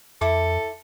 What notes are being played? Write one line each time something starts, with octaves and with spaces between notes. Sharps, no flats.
F2 E4 A4 D6